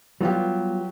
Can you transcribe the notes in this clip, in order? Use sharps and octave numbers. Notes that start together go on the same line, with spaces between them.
F#3 G3 B3 F4 G4